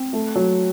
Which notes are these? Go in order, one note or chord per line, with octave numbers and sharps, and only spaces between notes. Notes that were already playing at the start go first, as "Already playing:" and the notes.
Already playing: C4
A3
F#3